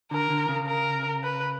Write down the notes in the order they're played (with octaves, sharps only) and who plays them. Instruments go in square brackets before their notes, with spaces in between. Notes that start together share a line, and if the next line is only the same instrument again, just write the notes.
[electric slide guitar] D3 [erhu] A#4
[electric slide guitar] D3
C#3
[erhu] A#4
B4